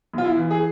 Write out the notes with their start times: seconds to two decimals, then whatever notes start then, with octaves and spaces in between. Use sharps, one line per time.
0.14 B1 F4
0.24 E4
0.36 E3
0.51 G#4